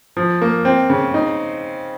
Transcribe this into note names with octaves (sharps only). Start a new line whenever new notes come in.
F3
A#3
C4
C#3
D#4